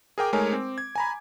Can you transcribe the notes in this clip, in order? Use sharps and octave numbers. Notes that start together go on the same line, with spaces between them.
G#4 A#4 G5 D6
G#3 A3 D#4 A#4 C#5 G#5
C4
G#6
G#5 A#5 B5